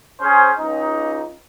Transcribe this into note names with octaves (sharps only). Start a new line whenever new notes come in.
C#4 G#4 C5
C#2 D#4